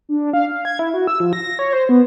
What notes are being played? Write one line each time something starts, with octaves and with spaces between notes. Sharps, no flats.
D4
F5
F5
G#6
E4
F#4
E6
F3
A#6
C#5
C5
B3